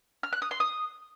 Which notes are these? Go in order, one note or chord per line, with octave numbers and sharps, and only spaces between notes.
F6
F#6
D#6
C6
D#6